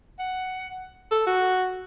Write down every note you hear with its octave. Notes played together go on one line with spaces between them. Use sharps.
F#5
A4
F#4